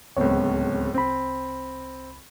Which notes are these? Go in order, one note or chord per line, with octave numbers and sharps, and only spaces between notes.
D1 C#2 B3 C4 C#5
C2 C4 B5